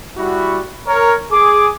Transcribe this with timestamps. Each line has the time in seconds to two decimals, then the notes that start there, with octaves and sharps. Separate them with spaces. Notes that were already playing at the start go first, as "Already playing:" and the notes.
0.17 G3 E4 F#4
0.86 A#4 C#5
1.31 G#4 D6